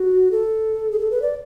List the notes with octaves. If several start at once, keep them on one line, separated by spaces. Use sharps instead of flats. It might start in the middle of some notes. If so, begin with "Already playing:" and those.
Already playing: F#4
A4
G#4
A4
B4
D5